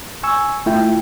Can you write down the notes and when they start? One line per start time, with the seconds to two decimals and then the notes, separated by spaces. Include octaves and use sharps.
0.23 G#5 C#6 E6
0.66 A3 E4 F4 E5 G5